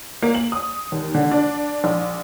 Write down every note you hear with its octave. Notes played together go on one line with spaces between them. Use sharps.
A#3
F#7
D#6
D#2
D3
D4
A#1